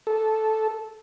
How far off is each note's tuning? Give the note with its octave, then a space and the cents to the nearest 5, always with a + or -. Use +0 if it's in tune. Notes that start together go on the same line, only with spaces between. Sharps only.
A4 -10